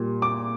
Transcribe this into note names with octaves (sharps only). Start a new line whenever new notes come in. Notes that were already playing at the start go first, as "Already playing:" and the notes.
Already playing: A#2 G3 A#3
D6